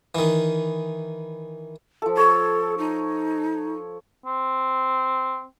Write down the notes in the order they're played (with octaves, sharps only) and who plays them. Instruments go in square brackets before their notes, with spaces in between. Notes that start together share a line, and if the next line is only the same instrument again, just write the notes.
[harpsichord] D#3 E3
[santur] F3 A4
[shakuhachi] A4 [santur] C#5
[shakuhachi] D#4
[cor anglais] C4